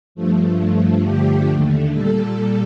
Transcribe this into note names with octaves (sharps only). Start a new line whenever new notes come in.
G2 F3 A3
G2 F3 A3
G2 D3 F3 A3 G4
D#2 D3 A3
A#2 G3 A4